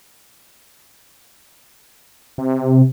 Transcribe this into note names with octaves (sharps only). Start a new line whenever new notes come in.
C3